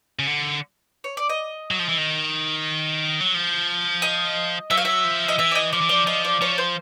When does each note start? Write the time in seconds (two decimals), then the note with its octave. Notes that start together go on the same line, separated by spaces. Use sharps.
0.19 C#3
0.27 D3
1.04 C#5
1.17 D5
1.29 D#5
1.71 F#3
1.79 F3
1.89 E3
1.98 D#3
3.21 F#3
3.34 F3
4.02 D#5
4.71 F#3 E5
4.77 F5
4.85 E5
5.04 F3
5.28 D#5
5.39 E3 E5
5.51 D5
5.55 D#5
5.73 F3 D5
5.81 E3
5.89 F3 D5
6.07 F3 D#5
6.24 D5
6.41 F3 C#5
6.58 C5